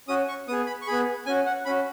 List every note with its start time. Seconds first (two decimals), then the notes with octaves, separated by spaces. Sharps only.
0.08 C#4 F#4 D#6
0.28 C#6
0.48 B3 G#4 D#6
0.67 B5
0.82 C#6
0.87 B3 G#4 B5
1.26 C#4 F#4 G#5
1.46 F#5
1.65 C#4 F#4 B5